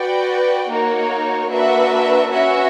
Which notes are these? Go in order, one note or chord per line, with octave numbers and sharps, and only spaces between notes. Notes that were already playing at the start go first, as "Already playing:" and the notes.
Already playing: F#4 B4 D5 G5
A#3 D#4 F#4 A#4 C#5
A#3 D4 F#4 B4 E5
C#4 F#4 B4 E5